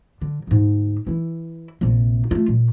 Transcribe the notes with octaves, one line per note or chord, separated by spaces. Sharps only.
D3
D2 G#2
E3 E4
A#1 C3
A3 F4
A#2